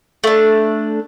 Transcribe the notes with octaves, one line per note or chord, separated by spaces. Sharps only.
A3 D4